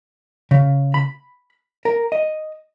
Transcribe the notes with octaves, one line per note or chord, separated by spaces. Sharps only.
C#3
B5
A#4
D#5